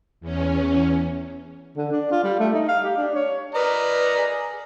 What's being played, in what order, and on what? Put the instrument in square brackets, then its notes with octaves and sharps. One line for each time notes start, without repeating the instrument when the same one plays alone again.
[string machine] E2 C#4
[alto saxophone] D3
D4
F4
G3
A3
D#4
F5
G4
D4
C#5
[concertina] A#4 D#5 [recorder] B4 [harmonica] D5 A#5
[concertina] G#4